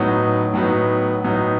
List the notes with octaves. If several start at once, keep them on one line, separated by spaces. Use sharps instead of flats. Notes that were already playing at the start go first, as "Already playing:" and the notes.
Already playing: A2 F#3 B3 D#4
A2 F#3 B3 D#4
A2 F#3 B3 D#4